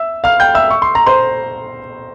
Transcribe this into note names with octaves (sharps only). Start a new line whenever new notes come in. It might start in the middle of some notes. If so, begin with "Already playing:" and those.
Already playing: E5 E6
F5 F6
G5 G6
E5 E6
C#6
C6
A#5
C5 C6